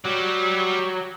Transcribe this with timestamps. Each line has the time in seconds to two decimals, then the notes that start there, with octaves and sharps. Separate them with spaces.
0.05 F#3 G3 D5